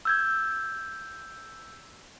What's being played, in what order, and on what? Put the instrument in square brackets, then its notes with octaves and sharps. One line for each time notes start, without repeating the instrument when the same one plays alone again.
[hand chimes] E6 G6 G#6